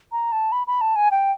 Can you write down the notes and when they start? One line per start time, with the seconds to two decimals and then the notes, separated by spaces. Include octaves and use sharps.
0.12 A#5
0.32 A5
0.52 B5
0.67 B5
0.81 A5
0.96 G#5
1.11 G5